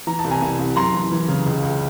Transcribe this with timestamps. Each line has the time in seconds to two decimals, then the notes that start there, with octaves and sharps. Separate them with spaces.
0.07 E3 A#5
0.19 A5
0.24 C2
0.31 G#5 A#5
0.42 C2
0.59 C2
0.76 F#2 A#5 C6
0.94 E3
1.12 E3
1.28 C#3
1.46 C#2
1.63 C#2